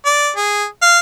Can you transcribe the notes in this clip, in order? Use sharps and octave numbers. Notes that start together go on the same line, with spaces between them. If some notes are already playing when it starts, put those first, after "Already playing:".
D5
G#4
F5